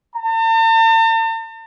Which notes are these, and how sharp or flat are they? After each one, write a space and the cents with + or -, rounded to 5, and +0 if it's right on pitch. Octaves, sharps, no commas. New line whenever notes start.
A5 +45